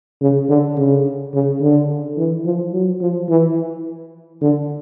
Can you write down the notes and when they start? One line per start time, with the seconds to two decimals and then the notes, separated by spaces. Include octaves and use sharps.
0.21 C#3
0.49 D3
0.78 C#3
1.34 C#3
1.61 D3
2.17 E3
2.45 F3
2.73 F#3
3.01 F3
3.29 E3
4.42 D3